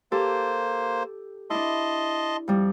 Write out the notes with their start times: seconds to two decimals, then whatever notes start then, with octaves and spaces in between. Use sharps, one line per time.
0.12 A#3 G4 A4 C5
1.50 D4 E4 D#5 A5 C6
2.48 F2 G3